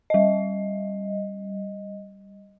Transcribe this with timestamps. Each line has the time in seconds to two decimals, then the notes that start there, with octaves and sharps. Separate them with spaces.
0.10 G3 D#5